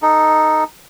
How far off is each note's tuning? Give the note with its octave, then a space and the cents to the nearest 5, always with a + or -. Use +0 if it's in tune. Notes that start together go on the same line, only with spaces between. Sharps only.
D#4 +0 A4 +0